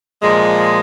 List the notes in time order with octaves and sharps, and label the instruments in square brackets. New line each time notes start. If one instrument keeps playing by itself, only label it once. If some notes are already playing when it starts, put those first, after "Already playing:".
[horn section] A#2 F3 G#3